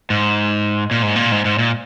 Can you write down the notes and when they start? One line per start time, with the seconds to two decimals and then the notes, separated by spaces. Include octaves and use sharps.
0.10 G#2
0.91 A#2
1.03 G#2
1.16 A#2
1.32 G#2
1.45 G#2
1.59 A#2